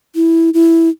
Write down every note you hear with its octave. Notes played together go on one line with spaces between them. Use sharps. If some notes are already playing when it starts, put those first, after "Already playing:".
E4
E4